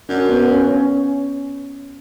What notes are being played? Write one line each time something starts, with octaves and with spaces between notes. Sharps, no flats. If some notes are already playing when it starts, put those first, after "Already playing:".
F#2 D4
B3
C#4
C#4